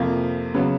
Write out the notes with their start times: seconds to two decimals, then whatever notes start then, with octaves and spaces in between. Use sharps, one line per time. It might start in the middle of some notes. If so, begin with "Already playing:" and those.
Already playing: F2 C3 F3 A#3
0.54 C#3 F#3 B3